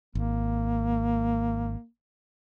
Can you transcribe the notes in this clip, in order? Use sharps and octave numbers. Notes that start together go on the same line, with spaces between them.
G#1 A#3